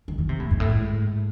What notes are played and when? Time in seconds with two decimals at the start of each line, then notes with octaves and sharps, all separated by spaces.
0.08 D#3
0.18 D#3
0.29 C3
0.40 A2
0.51 G#2
0.60 A2
0.70 G#2